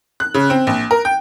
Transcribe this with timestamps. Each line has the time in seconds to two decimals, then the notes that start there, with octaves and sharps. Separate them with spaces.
0.20 F#6
0.34 C#3
0.50 C4
0.67 A#1
0.91 A#4
1.05 G5